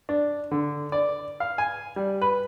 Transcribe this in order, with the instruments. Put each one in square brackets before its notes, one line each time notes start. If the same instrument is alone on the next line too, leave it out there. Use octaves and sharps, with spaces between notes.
[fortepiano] D4
D3
D5
F5
G#5
G3
B4